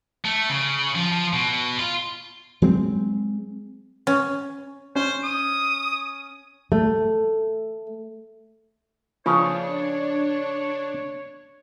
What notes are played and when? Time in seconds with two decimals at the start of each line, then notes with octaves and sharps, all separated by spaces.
0.25 A3
0.49 C#3
0.95 F3
1.13 F3
1.33 B2
1.79 F4
2.62 F#3 G#3 C4
4.07 C#4
4.96 C#4 C5
5.23 D#6
6.72 A3
9.26 C#3 F3 D4 B4 C#5